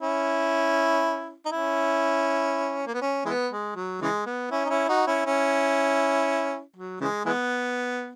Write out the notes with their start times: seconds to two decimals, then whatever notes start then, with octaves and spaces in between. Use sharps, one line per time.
0.01 C#4 E4
1.46 D#4
1.52 C#4 E4
2.87 A#3
2.94 B3
3.02 C#4
3.26 E3 G#3 B3
3.52 G#3
3.76 F#3
4.02 C#3 E3 G#3
4.26 B3
4.51 C#4 E4
4.65 D#4
4.70 C#4 E4
4.88 D#4 F#4
5.07 C#4 E4
5.26 C#4 E4
6.76 F#3
7.01 C#3 E3 G#3
7.25 E3 G#3 B3